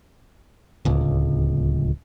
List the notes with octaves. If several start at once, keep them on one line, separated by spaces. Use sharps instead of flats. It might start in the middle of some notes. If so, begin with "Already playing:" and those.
D1 C#2